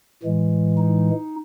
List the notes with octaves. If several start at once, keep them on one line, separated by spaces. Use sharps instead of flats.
A2 E3 G#3
D#4